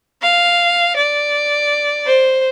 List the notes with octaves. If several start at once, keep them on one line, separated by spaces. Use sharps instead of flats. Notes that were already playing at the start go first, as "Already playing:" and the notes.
F5
D5
C5